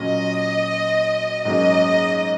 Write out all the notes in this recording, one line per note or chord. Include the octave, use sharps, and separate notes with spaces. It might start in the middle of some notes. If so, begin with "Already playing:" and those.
Already playing: A#2 F#3 C#4 D#5
G#2 F#3 A#3 C#4 D#5